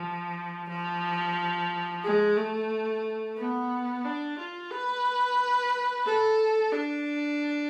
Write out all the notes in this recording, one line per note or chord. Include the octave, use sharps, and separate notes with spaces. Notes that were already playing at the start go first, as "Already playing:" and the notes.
Already playing: F3
F3
G#3
A3
B3
D4
F4
B4
A4
D4